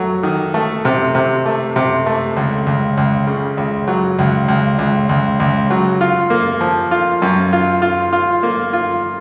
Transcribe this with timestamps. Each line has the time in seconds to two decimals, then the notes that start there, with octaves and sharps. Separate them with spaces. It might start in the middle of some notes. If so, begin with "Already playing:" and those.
Already playing: F#3 A3
0.23 D#3
0.54 A3
0.85 C3
1.15 C3
1.46 A3
1.76 C3
2.06 A3
2.37 C#2
2.67 C#2
2.97 C#2
3.27 C#3
3.57 C#2
3.88 F#3
4.19 C#2
4.48 C#2
4.79 C#2
5.09 C#2
5.40 C#2
5.70 F#3
6.01 F4
6.30 A#3
6.61 F3
6.91 F4
7.22 F#2
7.53 F4
7.82 F4
8.13 F4
8.43 A#3
8.73 F4